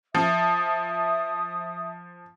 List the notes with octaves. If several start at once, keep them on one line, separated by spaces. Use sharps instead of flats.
F3 E5 D#6